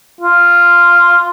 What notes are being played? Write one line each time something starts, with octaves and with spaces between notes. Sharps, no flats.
F4